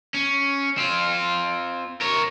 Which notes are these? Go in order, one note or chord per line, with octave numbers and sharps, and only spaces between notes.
C#4
C4 F4
A#4 C#5